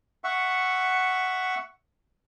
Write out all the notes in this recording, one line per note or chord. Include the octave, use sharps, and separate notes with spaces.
E5 F#5 C#6